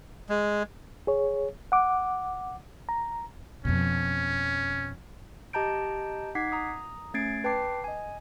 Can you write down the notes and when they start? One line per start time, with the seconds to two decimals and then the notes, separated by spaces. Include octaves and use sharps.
0.29 G#3
1.07 G#4 C#5
1.72 F#5 D6
2.89 A#5
3.65 F2 B2 C#4
5.53 G4 D#5 A5 A#5 G6 D7
6.35 D#4 F#5 D6 G#6 B6 C7
6.52 A#5 D#6
7.14 A3 C#4 G#6 A6 C7 D7
7.44 B4 G5 A5 D6 C7
7.84 D#5 G#5